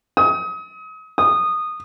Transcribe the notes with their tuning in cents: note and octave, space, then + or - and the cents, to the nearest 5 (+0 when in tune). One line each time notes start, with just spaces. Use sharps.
D#6 +35
D#6 -15